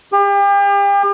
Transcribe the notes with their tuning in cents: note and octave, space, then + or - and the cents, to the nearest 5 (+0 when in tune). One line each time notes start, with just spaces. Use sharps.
G4 +40